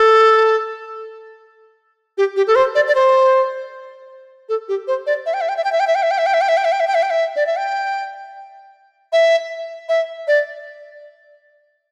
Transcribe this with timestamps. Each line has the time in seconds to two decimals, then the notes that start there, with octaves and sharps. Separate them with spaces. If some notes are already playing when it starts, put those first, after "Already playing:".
Already playing: A4
2.18 G4
2.36 G4
2.47 A4
2.56 C5
2.75 D5
2.88 D5
2.95 C5
4.49 A4
4.69 G4
4.88 C5
5.07 D5
5.26 E5
5.34 G5
5.41 E5
5.49 G5
5.57 E5
5.64 G5
5.72 E5
5.80 G5
5.87 E5
5.95 G5
6.03 E5
6.11 G5
6.18 E5
6.26 G5
6.34 E5
6.41 G5
6.49 E5
6.57 G5
6.65 E5
6.72 G5
6.80 E5
6.88 G5
6.95 E5
7.03 G5
7.10 E5
7.36 D5
7.47 E5
7.58 G5
9.13 E5
9.89 E5
10.28 D5